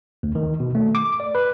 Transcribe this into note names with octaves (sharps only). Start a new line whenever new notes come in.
D2
D#3
B2
A3
D6
D5
B4